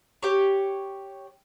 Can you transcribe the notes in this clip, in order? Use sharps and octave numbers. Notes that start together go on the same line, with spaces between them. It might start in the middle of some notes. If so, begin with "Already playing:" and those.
G4 C#5